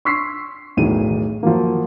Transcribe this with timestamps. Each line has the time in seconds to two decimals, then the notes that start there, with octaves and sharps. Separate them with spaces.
0.05 C6 C#6 E6 B6 C7
0.77 B1 E2 A2 D#3 D#7
1.43 F3 F#3 A#3